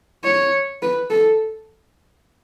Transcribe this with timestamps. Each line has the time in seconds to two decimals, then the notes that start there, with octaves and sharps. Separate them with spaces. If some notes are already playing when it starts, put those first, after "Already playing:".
0.24 C#5
0.82 B4
1.10 A4